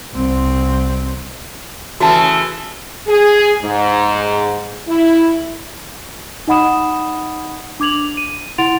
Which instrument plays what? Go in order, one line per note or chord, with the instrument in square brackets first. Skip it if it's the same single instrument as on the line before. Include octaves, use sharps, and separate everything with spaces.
[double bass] C2 C4
[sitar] C#3 E3 A3 [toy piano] F#4 A5
[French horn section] G#4
G#2
E4
[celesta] D#4 D#5 F#5 B5 D#6 E7
D4 D6 G#6 F7 F#7
D#7
E4 F#5 C6 A6 D7 F7